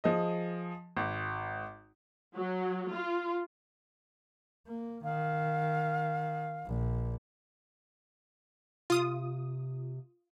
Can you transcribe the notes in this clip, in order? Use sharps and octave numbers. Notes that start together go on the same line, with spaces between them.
F3 G#4 D#5
G#1
F#3
F4
A#3
D#3 F5
A#1
C3 F4 D#6